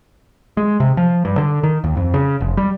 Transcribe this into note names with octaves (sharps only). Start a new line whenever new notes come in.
G#3
C3
F3
G2
D3
D#3
D#2
F2
C#3
F1
G3